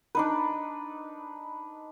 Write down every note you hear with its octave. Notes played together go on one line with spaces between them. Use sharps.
D4 D#4 B4